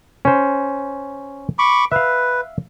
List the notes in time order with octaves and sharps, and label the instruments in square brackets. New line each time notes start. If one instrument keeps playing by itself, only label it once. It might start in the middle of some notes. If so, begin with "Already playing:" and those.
[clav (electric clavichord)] C#4 C5
[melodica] B5 C#6 D6
[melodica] B4 [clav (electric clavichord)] E5 F5